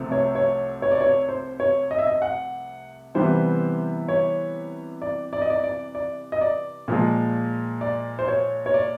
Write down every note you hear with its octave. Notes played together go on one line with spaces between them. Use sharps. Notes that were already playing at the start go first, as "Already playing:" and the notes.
Already playing: C2 C3 F3 A3 C4
C#5
C#5
C#5
D5
C#5
C5
C#5
D#5
E5
D#5
F#5
C3 E3 G3 B3 C5
C#5
D5
D5
D#5
D5
D5
D5
D#5
D5
A#2 F3 G#3
D5
C5
C#5
C#5
D5